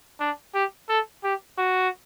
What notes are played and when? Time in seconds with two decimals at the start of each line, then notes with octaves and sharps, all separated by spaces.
0.20 D4
0.55 G4
0.89 A4
1.24 G4
1.58 F#4